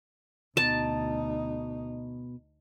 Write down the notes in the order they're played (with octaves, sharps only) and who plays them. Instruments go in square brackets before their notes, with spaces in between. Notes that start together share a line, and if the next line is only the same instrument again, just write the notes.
[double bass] D2 D#4 [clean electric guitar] B2 [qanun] A5